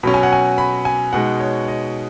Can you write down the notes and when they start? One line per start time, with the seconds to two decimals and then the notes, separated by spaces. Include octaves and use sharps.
0.03 B2 F#3 C#4 B5
0.14 G#5
0.23 F#5
0.33 G#5
0.58 B5
0.85 G#5
1.13 B2 G#3 D#4 F#5
1.40 C#5
1.68 D#5